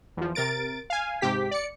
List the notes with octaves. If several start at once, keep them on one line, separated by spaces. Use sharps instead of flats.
E2 F3
C3 A#4 A6 D7
F5 G#5
G#2 C3 G4 B6
D5 C#7